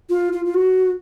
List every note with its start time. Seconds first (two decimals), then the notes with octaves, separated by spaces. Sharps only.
0.09 F4
0.32 F4
0.45 F4
0.54 F#4